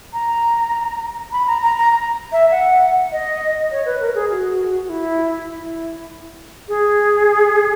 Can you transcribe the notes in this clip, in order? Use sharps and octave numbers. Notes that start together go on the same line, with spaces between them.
A#5
B5
A#5
A#5
A#5
E5
F#5
D#5
C#5
B4
A#4
G#4
F#4
F#4
E4
E4
G#4